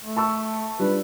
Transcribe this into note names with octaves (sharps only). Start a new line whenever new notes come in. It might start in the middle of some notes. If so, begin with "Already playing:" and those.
A3
A5 C#6 E6
G3 D4 F4 B4